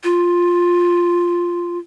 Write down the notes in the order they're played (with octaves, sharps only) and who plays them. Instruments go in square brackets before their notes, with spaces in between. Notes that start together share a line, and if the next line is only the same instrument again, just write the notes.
[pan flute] F4